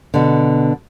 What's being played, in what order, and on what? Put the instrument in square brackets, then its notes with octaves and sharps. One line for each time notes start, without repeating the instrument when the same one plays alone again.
[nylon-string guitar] B2 D3